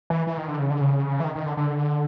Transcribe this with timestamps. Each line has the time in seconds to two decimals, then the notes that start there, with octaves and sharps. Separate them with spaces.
0.10 E3
0.27 E3
0.37 D#3
0.48 D3
0.59 C#3
0.70 D3
0.81 C#3
1.20 E3
1.24 D#3
1.35 D#3
1.46 D3
1.57 D3